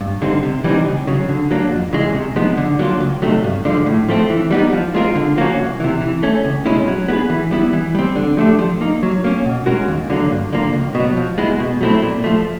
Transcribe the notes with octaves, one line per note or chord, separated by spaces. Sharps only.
G2
D3 G3 C4 D#4
C3
E3 G3 C4 D#4
C#2
C#3 F#3
D3
F#3 A#3 D4
F2
C#3 E3 G#3
C3
F3 G#3 B3 D#4
D3
F#3 A#3 D4 F4
C#2
C3 D#3 F#3 A3
G2
D3 F3 G#3
A2
F3 A3 C4
E3
G3 B3 D#4
F3
G#3 C4 F4 A#4
D3
F3 A#3 C#4 F#4
C2
C3 E3
E3
A3 C#4
C#2
B2 G#3 C#4 E4
F#3
B3 D#4 G#4 B4
E3
G3 B3 E4
E3
G3 C4
D3
F3 A3 D4 G4
F3
A#3 D#4
F#3
A#3 C#4
B2
G#3 C#4 F#4 A#4
D#2
D3 F#3 A#3
G2
D3 F3 A#3
C#2
B2
F#3
F3
G#3 B3 E4
B2
F#3 A3 C4 E4
A#2
F3 A3